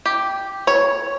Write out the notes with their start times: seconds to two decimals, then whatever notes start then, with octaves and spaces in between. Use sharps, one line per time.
0.06 G4
0.67 C#5